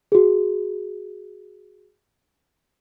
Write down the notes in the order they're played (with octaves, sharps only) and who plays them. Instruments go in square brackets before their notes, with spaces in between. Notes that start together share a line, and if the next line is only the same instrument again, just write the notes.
[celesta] F#4 G#4